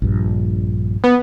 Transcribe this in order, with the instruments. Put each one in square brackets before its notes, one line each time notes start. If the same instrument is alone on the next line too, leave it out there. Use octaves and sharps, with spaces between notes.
[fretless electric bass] A#1 G2
[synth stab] B3